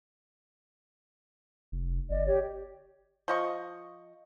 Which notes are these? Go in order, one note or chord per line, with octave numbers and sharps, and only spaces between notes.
F1
G1 D5 D#5
G4 C#5
F3 D#5 C#6